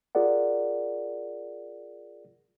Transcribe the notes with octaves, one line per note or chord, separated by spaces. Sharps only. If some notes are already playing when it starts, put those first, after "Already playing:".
F4 G#4 A#4 D5 F#5